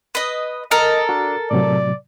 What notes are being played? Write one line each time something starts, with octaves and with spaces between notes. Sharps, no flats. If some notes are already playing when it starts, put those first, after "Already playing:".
B4 D#5
A4 A#4 D#5
D4 F#4
A2 C3 F#3 D5